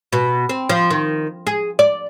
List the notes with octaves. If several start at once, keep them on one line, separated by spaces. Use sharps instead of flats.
B2
C4
F3
D#3
G#4
D5